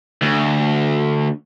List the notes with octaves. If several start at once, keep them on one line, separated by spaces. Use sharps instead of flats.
D2